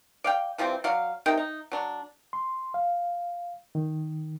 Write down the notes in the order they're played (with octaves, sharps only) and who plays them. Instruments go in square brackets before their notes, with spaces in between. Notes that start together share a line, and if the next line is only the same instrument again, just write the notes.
[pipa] D5 F5 G5
E3 F3 G3 C4
F#3 D5 F5
C3 D#4 A#4 G5
D#4
F#3 D4
[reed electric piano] C6
F5
D#3